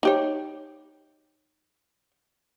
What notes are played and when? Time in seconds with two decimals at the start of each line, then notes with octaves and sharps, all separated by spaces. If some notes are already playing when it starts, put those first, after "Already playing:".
0.03 D#4 G4 C#5